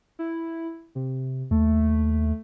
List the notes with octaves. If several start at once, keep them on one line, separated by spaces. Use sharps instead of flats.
E4
C3
D#2 A3